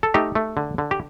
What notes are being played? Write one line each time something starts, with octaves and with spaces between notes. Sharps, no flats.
A4
A3 D#4 G4
A3
D3
D3
G4